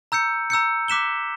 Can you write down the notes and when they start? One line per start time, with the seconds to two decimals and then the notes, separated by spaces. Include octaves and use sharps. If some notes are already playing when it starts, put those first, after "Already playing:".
0.12 A#5 E6 G6 C#7
0.50 A#5 E6 G6 C#7
0.88 D6 F#6 B6 E7 G7